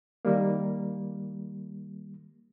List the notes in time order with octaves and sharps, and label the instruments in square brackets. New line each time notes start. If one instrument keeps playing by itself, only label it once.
[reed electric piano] D#3 G3 A#3